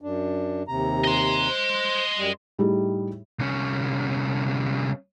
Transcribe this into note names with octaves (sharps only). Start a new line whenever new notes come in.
F#2 D4
D#2 C3 A#5
D#5 C6
C5
F#2 G3
A2 G3 D#4 E4 G4 G#4
C2 C#4